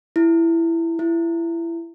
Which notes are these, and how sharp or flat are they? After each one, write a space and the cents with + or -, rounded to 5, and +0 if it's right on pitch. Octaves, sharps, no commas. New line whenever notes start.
E4 +10
E4 +25